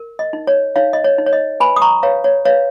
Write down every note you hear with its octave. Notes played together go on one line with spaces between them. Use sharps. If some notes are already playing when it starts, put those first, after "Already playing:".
Already playing: A#4
D#5
D#4
C#5
D#4 C#5 F5
D#5
C#5
D#4
C#5
D#5
B4 G#5 B5
D#6
A#5 C#6
B4 C#5 F5
C#5
B4 C#5 F5